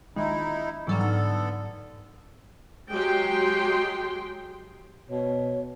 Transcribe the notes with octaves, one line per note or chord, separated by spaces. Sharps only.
A#1 D#3 G#3 D#4 E4
G#2 D3 E3 F#3 G3 B3 A4
D#4 F6
F#3 G#3 G4 G5 C6
B2 C#5